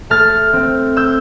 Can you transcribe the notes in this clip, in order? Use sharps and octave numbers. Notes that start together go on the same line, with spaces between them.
A3 F6 A6
C4
E6 G6